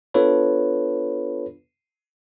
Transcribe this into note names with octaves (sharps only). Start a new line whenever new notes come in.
B3 D4 F4 A4 B4 C#5